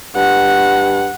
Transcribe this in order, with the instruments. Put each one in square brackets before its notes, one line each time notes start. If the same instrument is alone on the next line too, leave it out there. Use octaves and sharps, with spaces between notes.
[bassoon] G2 [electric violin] F#5